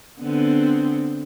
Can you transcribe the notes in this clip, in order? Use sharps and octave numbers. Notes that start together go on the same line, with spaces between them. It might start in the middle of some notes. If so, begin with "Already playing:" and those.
D3 B3 C4